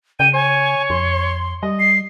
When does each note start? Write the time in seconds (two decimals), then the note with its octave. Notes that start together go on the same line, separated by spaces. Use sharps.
0.20 C#3 G5 D#7
0.34 C#5 G#5
0.90 F2 C6
1.63 G3 D#5
1.80 C7